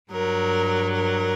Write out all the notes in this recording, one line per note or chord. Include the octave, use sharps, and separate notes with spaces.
G2 F#3 A#4
A#4